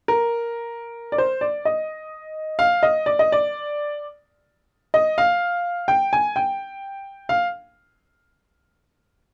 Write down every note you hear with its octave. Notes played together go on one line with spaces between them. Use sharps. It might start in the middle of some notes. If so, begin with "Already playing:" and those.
A#4
D5
C5
D5
D#5
F5
D#5
D5
D#5
D5
D#5
F5
G5
G#5
G5
F5